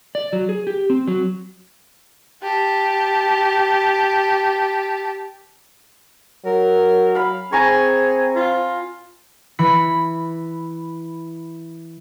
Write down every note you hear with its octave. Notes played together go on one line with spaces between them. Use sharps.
D5
F#3
G#4
G4
C4
F#3
G4 A5
F#3 A#4
F5 B5
C4 G#4 G#5 A#5 C#6
F4
E3 B5 C#7